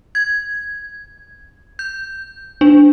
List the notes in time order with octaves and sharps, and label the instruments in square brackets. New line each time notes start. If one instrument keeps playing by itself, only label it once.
[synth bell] G#6
G6
D4